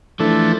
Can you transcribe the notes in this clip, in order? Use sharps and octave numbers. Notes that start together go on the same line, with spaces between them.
E3 F3 A3 D4 A4